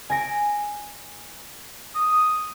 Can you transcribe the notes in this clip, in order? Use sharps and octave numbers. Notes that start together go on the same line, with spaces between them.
G#5 A#6 D7
D#6